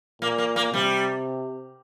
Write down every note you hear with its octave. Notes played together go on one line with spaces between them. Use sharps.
A#2 A#3
A#3
A#3
C3 G3